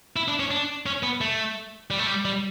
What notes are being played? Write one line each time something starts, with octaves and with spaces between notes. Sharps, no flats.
E4
D4
C#4
D4
C#4
B3
A3
G3
A3
G3
G3